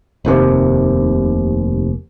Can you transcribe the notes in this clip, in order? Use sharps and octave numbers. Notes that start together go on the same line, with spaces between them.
F1 D#2 C3